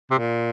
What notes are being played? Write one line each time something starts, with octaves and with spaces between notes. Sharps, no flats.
C3
A#2